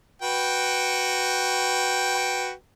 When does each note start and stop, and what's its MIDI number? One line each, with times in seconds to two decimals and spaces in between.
0.22 2.52 66
0.22 2.52 71
0.22 2.52 79